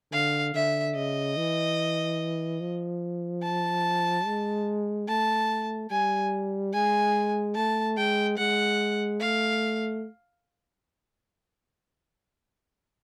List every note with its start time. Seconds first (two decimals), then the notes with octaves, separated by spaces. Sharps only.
0.12 D3 F5
0.54 D3 E5
0.96 C#3 D#5
1.37 E3
2.60 F3
3.43 A5
4.25 G#3
5.08 A3 A5
5.91 G3 G#5
6.73 G#3 G#5
7.55 A3 A5
7.97 G#3 G5
8.38 G#3 F#5
9.21 A3 F5